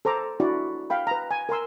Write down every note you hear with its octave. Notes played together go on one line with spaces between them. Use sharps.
A4 C5 A#5 D6
D4 E4 F#4 D5
F5 G5 B5
B4 A#5
G#5
A#4 G#5 C6 E6